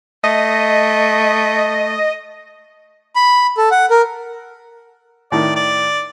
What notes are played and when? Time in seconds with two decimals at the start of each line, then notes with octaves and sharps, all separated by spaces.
0.24 A3 D#5
3.16 B5
3.57 A4
3.71 F#5
3.90 A#4
5.32 A2 D#3 D5
5.56 D5